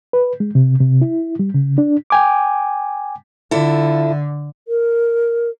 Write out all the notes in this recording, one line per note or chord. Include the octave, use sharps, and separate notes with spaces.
B4
G#3
C3
C3
E4
G3
C#3
D4
G5 G#5 D6
D3 E4 F4 A4
A#4